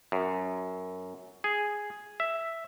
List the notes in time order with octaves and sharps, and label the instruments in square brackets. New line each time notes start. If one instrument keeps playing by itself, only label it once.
[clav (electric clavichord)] F#2
G#4
E5